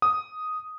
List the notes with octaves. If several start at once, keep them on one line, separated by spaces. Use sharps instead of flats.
D#6